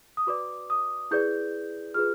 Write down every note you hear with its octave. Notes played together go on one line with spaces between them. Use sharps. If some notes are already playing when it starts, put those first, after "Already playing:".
D#6
F#4 B4 D5 D6
D#6
E4 G#4 B4 D5 G6
F4 G#4 B4 F6